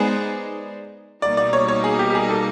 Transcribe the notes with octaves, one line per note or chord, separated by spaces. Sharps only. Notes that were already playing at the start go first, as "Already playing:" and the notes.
Already playing: G#3 B3 D#4 G#4 C5 D5
B2 G3 A#3 D#4 D5
D5
C#5
C#5
G#4
G4
G4
G#4
A4